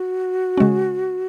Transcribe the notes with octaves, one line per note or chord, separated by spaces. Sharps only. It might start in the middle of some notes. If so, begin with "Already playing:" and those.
Already playing: F#4
C#3 G#3 C#4